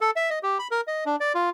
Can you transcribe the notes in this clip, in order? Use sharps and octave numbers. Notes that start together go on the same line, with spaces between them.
A4
E5
D#5
G4
B5
A#4
D#5
D4
D5
F4